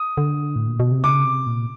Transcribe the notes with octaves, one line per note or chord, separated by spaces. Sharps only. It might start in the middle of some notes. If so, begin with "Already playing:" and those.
Already playing: D#6
D3
A2
A#2
B2
C3
C#3 D6
C3
A#2